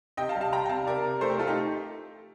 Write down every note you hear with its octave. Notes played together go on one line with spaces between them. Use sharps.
C3 D#5 G5
F5 A5
G3
F5 A5
C3 G5 A#5
G5
C3 F5 A5
C3 A#4 D5
C3
A3 A4 C5
G4 A#4
A3 F4 A4
D#4 G4